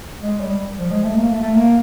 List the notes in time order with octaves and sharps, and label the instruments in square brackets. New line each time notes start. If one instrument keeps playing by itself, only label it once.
[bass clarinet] G#3
G3
F3
G#3
A3
A#3
A3
A3
A#3